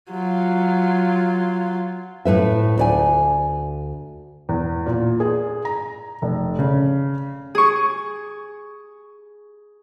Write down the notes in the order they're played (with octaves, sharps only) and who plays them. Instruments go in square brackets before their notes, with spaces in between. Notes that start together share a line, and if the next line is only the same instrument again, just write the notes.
[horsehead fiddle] F#3 F4
[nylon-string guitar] A2 A3 B4 E5
D2 D5 G#5
[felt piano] E2
A#2
G#4
A#5
F1
C#3
[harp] G#4 C#6